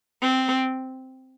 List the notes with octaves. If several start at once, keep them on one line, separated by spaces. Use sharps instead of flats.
C4